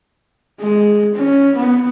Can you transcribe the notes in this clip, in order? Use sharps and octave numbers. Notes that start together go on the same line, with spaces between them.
G#3
C#4
B3